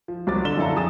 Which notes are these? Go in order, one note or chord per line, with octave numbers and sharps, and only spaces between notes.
F3
C2 F#3 C4 D6 A6
D3 D4 E7 G7
F#2 D3 E4 A4 F5 A#5
F2 G#4 D#6 A6 E7